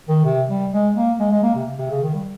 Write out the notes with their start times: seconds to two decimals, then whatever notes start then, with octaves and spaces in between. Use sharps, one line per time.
0.09 D#3
0.24 C3
0.48 G3
0.72 G#3
0.95 A#3
1.19 G#3
1.31 G#3
1.43 A#3
1.55 C3
1.78 C3
1.90 C#3
2.03 D#3
2.14 G3